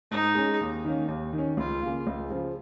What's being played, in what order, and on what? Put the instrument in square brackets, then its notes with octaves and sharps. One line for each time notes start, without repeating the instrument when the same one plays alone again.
[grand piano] G#2 [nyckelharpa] D#4
[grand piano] G#3 C#4
D#2
D#3 A#3 C#4
D#2
D#3
C#4
[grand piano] C#2 [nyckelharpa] F4
[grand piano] C#3 A#3
C#2
C#3 F3